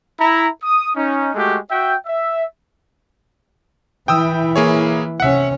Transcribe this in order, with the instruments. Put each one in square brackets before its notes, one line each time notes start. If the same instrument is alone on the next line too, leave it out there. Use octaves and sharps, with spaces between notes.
[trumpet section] E4 A#5
D#6
C#4 D#4
G#3 A3 F#4 G4
F#4 E5 G5
E5
[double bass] E3 E4 [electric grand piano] G5 D#6 E6
[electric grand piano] A#3 G#4 C#5
[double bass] C3 C#4 [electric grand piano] E5 F#5